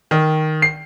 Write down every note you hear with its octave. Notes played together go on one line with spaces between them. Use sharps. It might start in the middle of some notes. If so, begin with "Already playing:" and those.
D#3
C7